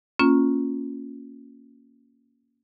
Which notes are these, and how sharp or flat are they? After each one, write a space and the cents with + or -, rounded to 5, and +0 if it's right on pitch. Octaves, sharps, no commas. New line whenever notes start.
A#3 +0 C#4 -5 F4 +10